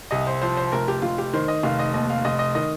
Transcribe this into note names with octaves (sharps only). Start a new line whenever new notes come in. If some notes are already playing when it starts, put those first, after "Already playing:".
C2 D#5
C5
F3 C5
C5
F1 A#4
G4
F1 F4
G4
D#3 C5
D#5
F1 F5
D#5
D#2 D#5
F5
F1 D#5
D#5
D#3 D#5